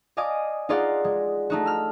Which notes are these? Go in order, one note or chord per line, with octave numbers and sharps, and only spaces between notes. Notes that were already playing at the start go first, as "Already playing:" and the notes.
D5 D#5 F5 G#5 D6 D#6
D#4 F4 G#4 D5 F5 F#5
G#3
A3 D#4 F#4
E6 F6